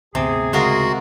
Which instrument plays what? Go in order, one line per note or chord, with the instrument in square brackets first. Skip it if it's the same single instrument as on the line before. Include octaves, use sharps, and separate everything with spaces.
[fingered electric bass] D2 G#2 B3 [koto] C3 [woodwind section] G#4
[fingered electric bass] D2 C#3 [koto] G#3 F4 A#4 [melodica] F#4